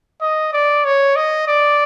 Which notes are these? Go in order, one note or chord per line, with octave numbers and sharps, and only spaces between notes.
D#5
D5
C#5
D#5
D5